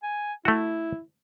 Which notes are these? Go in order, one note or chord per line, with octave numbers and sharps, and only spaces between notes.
G#5
A3 E4 F#4